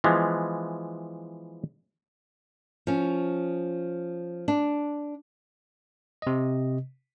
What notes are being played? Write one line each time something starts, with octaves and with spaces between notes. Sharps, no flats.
E3 F3 G#3 B3
F3 C#4
D4
C3 D#5